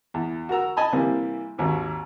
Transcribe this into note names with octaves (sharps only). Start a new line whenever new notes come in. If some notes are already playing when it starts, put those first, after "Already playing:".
E2
F#4 A#4 A#5 E6
D#5 G#5 A5 B5
C3 E3 G3 A#3
G#1 D#2 D#4